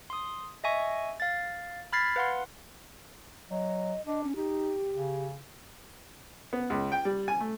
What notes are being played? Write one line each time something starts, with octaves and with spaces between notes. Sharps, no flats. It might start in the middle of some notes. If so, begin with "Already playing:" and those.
C6 D#6
D#5 E5 G#5 C#6
F5 A6
B5 F6 G#6 A6 B6 C7
B4 F5 F#5 C6
F#3 D#5
D4 D#5
C#4
D#4 G4
C#3
B3
C#2
G5
G3
G#5
A3